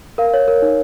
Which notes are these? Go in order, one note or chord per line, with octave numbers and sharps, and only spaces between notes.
A#4 F5
C#5
A#4
D#4